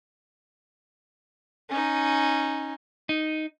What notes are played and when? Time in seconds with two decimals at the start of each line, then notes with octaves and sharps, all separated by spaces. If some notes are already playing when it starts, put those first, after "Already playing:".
1.70 C#4 D#4
3.09 D#4